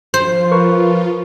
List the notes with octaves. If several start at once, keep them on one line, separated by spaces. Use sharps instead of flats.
F3 F4 C5
A#4 B4 C#6